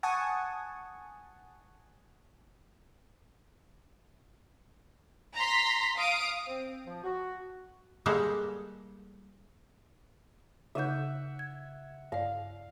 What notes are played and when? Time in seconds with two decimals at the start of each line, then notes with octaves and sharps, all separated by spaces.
0.03 F#5 G#5 A5 C#6 D#6
5.36 A#5 C6 B6
5.98 F5 D#6 D7
6.47 C4
6.86 F3
7.04 F#4
8.06 G3 G#3 A#3 A4 F5 F#5
10.75 C#3 D#4 E5 F#5 G6
11.39 G#6
12.12 G2 D5 F5